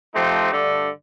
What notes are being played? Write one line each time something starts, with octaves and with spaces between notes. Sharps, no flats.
F3 A3 C4 D#4 G4
G2 D3 A3